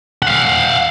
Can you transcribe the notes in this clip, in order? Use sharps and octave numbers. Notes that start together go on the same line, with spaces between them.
F5 F#5